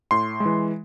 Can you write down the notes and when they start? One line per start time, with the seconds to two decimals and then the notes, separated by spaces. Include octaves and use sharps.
0.11 A2 C6
0.40 G#3
0.45 E3